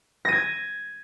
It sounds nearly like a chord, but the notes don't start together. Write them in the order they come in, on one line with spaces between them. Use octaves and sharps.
A#6 D#7 G#6